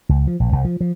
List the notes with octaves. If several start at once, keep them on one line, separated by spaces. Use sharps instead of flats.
C#2
F3
A#1
C2
F3
F3